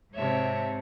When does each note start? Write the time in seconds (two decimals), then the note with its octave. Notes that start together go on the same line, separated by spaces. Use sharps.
0.14 G#2 C3 C#5 E5 A5